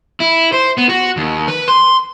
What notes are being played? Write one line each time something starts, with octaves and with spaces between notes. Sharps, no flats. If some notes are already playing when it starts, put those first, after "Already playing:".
E4
C5
B3
F#4
D#2
B4
C6